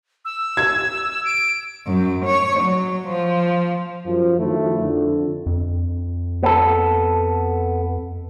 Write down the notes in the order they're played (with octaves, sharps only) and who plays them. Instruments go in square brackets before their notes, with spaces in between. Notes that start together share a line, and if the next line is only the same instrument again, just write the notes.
[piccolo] E6
[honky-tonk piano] G#6
[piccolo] D7
[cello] F#2
C#5
F#3
F3
[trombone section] F#2 F3
D3 D#3 F3 F#3 A3 E4
F2 D3
[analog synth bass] F2
[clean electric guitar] B3 A4